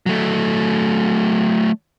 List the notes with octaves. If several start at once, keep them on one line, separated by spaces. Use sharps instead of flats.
F#3 A3